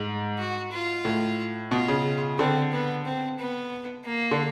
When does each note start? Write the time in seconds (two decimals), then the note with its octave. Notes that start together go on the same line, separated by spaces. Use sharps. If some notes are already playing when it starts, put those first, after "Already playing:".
Already playing: G#2
0.39 F#4
0.72 F4
1.05 A2
1.71 B2 F4
1.88 C#3
2.38 D3 C4
2.72 B3
3.05 C4
3.39 B3
4.05 A#3
4.31 D3